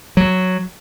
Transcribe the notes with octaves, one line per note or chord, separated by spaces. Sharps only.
F#3